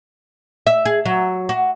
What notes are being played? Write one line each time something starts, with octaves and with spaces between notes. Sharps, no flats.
E5
G#4
F#3
F#4